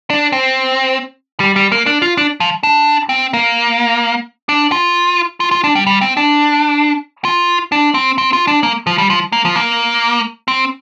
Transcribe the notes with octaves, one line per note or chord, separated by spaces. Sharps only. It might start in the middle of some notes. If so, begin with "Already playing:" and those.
D4
C4
G3
G3
A#3
D4
F4
D4
F3
D4
C4
A#3
D4
F4
F4
F4
D4
G3
G3
C4
D4
F4
D4
C4
C4
F4
D4
A#3
F3
G3
F3
A#3
F3
A#3
C4